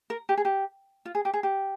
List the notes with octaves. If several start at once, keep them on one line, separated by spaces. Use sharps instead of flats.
A#4
G4
G#4
G4
F4
G#4
G4
G#4
G4